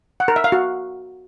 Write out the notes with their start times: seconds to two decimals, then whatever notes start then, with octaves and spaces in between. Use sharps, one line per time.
0.20 F#5
0.28 A#4
0.36 E5
0.44 F5
0.52 F#4